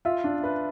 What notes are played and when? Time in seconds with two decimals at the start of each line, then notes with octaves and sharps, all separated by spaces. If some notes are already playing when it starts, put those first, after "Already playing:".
0.05 F4 E5
0.24 D4
0.44 B4